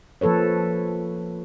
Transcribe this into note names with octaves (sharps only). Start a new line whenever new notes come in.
F3 A#3 A4 B4 C#5